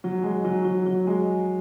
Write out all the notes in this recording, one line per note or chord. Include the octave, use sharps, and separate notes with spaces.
F#3
G#3
F#3
F#3
F#3
G#3